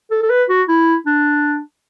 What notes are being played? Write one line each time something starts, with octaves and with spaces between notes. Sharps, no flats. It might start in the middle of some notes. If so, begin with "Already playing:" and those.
A4
A4
B4
F#4
E4
D4